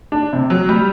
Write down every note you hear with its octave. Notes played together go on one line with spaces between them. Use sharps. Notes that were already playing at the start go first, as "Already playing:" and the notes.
D4
C3
F#3
G3